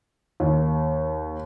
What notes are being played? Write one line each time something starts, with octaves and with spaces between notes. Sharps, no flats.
D#2